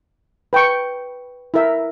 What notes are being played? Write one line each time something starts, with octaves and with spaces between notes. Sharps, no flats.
B4 G5 C#6
E4 A#4 E5